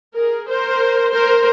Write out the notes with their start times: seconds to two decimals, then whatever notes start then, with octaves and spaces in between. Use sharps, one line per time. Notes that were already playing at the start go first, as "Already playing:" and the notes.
0.15 G#4 A#4
0.48 A#4 C5
1.13 A#4 C5